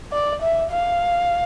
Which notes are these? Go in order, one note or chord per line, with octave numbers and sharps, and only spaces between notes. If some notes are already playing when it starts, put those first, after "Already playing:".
D5
E5
F5